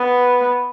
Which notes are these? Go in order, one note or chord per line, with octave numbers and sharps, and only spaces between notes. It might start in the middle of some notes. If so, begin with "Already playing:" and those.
Already playing: B3